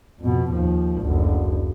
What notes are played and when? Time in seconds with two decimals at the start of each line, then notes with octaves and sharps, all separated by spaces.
0.20 F2 B2
0.51 D#2 F3
1.01 F#1 D2